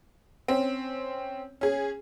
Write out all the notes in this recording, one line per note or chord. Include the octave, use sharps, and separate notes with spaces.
C4 C#4
C#4 G#4